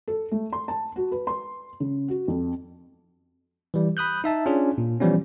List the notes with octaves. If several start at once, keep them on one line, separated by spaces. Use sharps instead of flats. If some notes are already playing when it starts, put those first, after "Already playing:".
A4
A3
C6
A5
F#4
B4
C6
C#3
F#4
F2
E3 G3
B5 D#6 F#6 G6
D#4 E5 A5
C#4 D4 F4 G#4
A#2
E3 F3 G3 B3 C#4